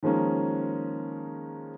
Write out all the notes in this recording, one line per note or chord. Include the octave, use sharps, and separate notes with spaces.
D#3 F3 G#3 A#3 C#4